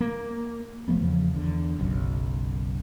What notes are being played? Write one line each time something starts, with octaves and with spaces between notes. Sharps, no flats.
A#3
E1 F3 A3 B3
E2 C#3 F3
E2 D3
F#1 B1 F#2